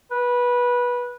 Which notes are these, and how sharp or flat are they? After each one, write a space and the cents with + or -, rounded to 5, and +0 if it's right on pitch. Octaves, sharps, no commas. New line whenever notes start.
B4 -20